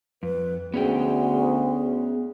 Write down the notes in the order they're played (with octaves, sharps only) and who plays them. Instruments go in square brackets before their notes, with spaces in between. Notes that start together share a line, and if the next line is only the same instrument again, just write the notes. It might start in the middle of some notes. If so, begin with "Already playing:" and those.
[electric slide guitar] F2 [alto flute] B4
[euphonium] D2 [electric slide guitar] B3 C#4 G5 [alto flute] G#4